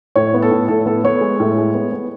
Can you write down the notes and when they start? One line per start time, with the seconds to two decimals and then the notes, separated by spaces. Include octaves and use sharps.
0.16 A2 C#5
0.34 B3
0.42 A4
0.51 A2
0.68 A2 A4
0.86 B3 A4
1.04 B3 C#5
1.21 G#3
1.40 A2
1.58 G#3
1.74 B3
1.92 B3